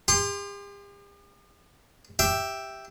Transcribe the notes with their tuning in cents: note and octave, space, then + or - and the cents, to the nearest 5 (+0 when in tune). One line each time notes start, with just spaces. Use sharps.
G4 +45 C6 +0
G4 +0 E5 +0